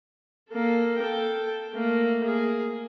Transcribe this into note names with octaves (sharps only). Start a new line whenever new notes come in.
A#3 A4
A4 G5
A3 A#3
A#3 G#4